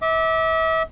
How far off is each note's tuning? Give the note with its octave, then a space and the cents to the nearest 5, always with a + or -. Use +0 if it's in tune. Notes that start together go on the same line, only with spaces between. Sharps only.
E5 -35 D6 +0